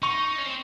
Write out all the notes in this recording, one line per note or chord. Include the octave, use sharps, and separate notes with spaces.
D#4 C#6
C#4
C4